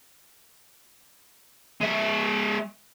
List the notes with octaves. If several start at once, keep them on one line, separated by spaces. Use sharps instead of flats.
G#3 E5